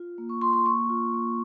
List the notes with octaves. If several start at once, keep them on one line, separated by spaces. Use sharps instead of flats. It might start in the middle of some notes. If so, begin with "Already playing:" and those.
Already playing: F4
A#3
C#6
F4 C6
C6
A#3 C#6
F4
A#3